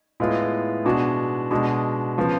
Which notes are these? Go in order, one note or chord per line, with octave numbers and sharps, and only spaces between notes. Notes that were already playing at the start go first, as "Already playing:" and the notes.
A2 G#3 B3 F4
B2 G#3 D4 F#4
B2 G#3 D4 F#4
C#3 F3 B3